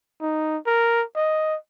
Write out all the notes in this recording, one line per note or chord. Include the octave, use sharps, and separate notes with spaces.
D#4
A#4
D#5